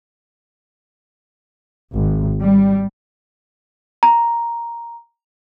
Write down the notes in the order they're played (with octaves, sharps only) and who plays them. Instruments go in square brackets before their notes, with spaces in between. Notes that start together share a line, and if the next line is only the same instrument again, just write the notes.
[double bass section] G#1
G3
[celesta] A#5